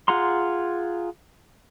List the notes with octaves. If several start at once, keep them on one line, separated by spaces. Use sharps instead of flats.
F4 G#4 F#5 A#5 C6